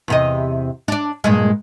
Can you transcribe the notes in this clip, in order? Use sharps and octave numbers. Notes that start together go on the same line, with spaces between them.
E2 C3 D#5
D4 D5
G2 A#2 G#3